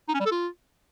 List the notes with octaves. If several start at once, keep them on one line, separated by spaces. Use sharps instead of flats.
D#4
C#4
G3
A4
F4